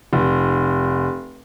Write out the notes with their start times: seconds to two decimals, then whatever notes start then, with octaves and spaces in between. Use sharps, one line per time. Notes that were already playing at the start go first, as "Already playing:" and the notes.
0.13 F1